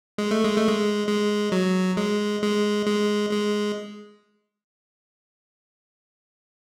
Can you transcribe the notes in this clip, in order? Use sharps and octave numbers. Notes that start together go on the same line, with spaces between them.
G#3
A3
G#3
A3
G#3
G#3
F#3
G#3
G#3
G#3
G#3